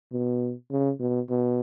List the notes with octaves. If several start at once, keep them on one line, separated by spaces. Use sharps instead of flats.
B2
C#3
B2
B2